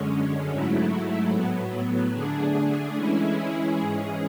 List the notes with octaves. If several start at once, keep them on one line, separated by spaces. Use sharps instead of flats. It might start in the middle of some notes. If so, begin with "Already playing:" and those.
Already playing: F#2 D3 G#3 C#4
G#2 F#3 A3 E4
A2 F#3 B3
D3 A3 D4 G#4
E3 G#3 C#4 E4 G#4
G#2 E3 G#3 C#4 G#4